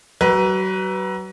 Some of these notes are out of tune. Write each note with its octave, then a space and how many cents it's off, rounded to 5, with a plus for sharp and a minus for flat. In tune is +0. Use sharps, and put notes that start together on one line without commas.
F#3 +35 B4 +0